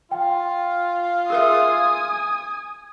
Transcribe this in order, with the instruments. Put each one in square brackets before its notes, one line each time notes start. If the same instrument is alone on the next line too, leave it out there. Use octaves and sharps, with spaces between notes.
[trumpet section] F4 [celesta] G5
[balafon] G#4 A#4 E5 [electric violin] G#5 D#6